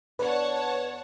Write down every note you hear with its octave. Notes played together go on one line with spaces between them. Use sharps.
E2 D4 B4 C#5 F#5 A5